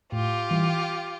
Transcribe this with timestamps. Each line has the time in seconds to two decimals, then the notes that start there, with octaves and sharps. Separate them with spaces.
0.12 A2 F4 G4
0.51 E3 G3